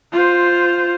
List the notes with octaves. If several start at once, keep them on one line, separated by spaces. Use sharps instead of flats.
F4 C5